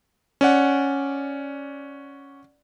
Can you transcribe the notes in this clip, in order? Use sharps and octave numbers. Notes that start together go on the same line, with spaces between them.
C#4 D5 F#5